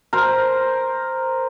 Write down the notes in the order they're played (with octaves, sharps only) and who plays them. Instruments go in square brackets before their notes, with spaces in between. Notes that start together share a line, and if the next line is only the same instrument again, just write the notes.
[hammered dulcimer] A#4 C5